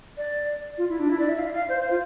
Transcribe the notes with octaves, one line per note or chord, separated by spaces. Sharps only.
D5
F4
E4
D4
E4
D5
E5
F5
F5
C5
C5
F4